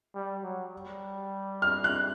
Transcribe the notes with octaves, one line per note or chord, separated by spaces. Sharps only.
G3
F#3
G3
F6
F#6